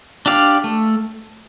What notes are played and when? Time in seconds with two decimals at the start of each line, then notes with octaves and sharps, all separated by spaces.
0.26 D4 G4 D5 F5
0.64 A3